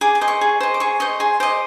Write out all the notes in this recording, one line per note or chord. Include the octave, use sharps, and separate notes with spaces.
G#4 D6
D6
C5 D#5
C#6
G#4
C5 D#5
D6
G#4 C#6
C5 D#5 C#6
G#4 C6
C5 D#5 D6